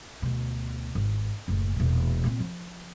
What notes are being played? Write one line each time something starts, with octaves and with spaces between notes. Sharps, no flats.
D2 B2
G#1
F#1 A2
E1 A#2
A#2 C4
F3